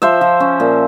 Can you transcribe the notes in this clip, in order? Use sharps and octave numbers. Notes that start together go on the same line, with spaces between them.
F3 C5 E5
F3
C#4
A#2